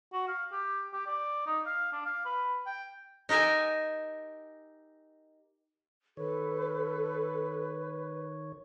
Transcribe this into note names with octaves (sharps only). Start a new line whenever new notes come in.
F#4
F5
G4
G4
D5
D#4
F5
D4
F5
B4
G5
D#4 G4 A#4 E5 G#5
D#3 A4 B4 C#5